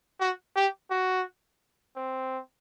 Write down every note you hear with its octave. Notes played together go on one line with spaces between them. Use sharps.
F#4
G4
F#4
C4